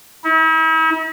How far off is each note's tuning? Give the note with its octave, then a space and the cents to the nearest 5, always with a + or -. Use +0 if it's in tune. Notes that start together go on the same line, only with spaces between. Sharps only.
E4 -45